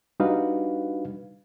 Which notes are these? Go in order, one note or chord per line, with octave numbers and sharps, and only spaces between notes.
G3 D4 D#4 F#4 B4 F5